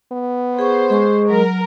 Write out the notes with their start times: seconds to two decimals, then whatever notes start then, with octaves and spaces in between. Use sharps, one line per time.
0.12 B3
0.59 G#4 C5 C#6
0.90 G#3 G#4 C#6
1.30 F#3 A#4